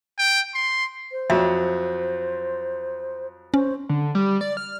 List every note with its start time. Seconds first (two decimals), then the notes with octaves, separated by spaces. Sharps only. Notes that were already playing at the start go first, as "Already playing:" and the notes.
0.19 G5
0.55 C6
1.12 C5
1.30 F2 F#3 E5
3.54 C#4 C5
3.89 D3
4.15 G3
4.41 D5
4.57 F6